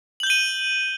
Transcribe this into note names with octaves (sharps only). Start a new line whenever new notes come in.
G6 D#7 F#7 G7